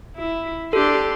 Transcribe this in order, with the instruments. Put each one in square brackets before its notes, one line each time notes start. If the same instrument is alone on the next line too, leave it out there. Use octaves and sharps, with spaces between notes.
[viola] E4
[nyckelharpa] D4 C6 [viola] G4 [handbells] A4